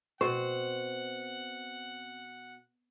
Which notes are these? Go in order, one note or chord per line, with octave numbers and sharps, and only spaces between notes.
B2 C4 C5 F#5 C#6